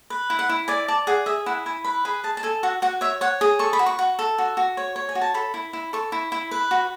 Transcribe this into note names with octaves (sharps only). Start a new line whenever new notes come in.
B4
E4
F#5
E4
D5 G#5
D5 A5
G#4 F#5
G#4 E5
E4 F#5
E4 G#5
B4 B5
G#4 B5
G#4 A5
A5
A4 G#5
F#4 F#5
F#4 F#5
C#5 E5
C#5 F#5
G#4
A4 C#6
B5
F#4
C#6
F#4
A4
F#4
F#4
C#5
C#5
G#5
F#4
A5
A4 B5
E4
E4
A4 C#6
E4
E4
B4
F#4